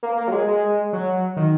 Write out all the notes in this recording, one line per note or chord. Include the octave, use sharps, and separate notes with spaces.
A#3
A#3
F#3
G#3
G#3
F#3
D#3